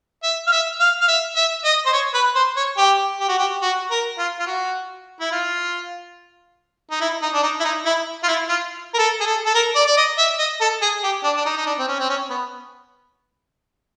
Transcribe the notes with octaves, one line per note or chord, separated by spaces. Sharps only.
E5
F5
E5
F5
F5
E5
E5
D#5
C5
C#5
B4
C5
C#5
G4
G4
F#4
G4
F#4
A#4
F4
F4
F#4
E4
F4
D#4
E4
D#4
D4
D#4
E4
D#4
E4
F4
E4
F4
A#4
A4
G#4
A4
A4
A#4
D5
D5
D#5
E5
D#5
A4
G#4
G4
D4
D4
D#4
D#4
D4
C4
C#4
C4
C#4
B3